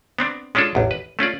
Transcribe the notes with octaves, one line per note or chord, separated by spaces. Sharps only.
B3 C4 D4
G#3 C#4 D4 F4 A4
A1 E2
B4
A3 C#4 F4 D5